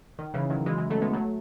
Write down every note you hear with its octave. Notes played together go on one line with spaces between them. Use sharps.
D#3
C#3 E3
D#3 F#3
E3 G#3
E3 G#3
F#3 A3
G#3 B3
F#3 A3